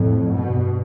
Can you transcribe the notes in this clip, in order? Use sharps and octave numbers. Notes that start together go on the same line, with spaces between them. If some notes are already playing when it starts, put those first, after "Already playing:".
Already playing: F2 A2
G2 B2